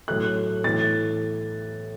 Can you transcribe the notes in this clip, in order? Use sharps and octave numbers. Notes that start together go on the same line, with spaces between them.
A2 F#3 A3 F#6
A2 E3 A3 A6